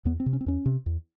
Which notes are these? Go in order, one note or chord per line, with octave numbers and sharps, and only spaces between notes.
E2 B3
C4
C3
C#4
C4
E2 C#4
C3
E2